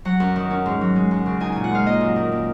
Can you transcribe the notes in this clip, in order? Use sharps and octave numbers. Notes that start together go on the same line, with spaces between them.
F#3 F#5
F#2
D#3
C#4
G#2
F#3
G#3
F#2
C#3
D#4 G#5
A#2 G#5
F#5
G#3 F5
A#3 D#5
F#2
D#3
A#3